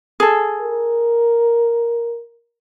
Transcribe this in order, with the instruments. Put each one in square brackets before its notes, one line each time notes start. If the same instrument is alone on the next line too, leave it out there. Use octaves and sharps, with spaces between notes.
[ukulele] G#4 A4
[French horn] A#4